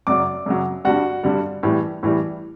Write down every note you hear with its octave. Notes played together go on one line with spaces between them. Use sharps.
F#2 C#3 F#3 D5 D6
F#2 C#3 F#3
G2 D3 G3 F#4 F#5
G2 D3 G3
A2 E3 G3
A2 E3 G3